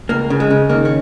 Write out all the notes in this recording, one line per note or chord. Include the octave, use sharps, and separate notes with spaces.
C#2 A#3
C#3
G#3
C#3
D#3 A#3
C#4